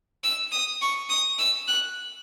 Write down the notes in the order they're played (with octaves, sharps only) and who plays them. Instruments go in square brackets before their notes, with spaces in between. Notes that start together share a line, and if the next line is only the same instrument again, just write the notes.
[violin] E6
D#6
C#6
D#6
E6
F#6